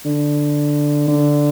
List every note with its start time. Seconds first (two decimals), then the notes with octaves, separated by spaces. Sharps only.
0.05 D3
1.08 D3